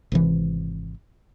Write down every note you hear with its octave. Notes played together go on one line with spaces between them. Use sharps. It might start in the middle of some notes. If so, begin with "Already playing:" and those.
G#1 C3 E3